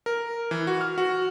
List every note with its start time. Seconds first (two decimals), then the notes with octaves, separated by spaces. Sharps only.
0.06 A#4
0.51 E3
0.67 F#4
0.81 F6
0.98 F#4